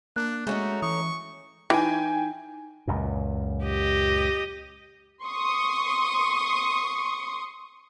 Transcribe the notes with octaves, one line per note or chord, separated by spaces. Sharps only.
A#3 D4 F#6
G#3 A3 C#4 D#4 F#4
E3 C#6 D#6
E3 D#4 G5 G#5
C#2 F#2 A#2
G4 D#5
C6 C#6 D#6